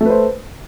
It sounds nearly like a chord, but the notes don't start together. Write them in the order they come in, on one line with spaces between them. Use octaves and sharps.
A3 B4 C5